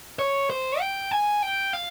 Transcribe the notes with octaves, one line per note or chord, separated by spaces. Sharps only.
C#5
C5
G5
G#5
G5
F5